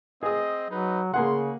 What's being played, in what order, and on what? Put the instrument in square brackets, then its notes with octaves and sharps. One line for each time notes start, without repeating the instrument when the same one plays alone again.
[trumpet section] C4 D#5 [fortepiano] G#4 D#6
[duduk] F#3 [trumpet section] D#4 B4
[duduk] C#3 [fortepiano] A#3 G#4 F#5 [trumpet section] C6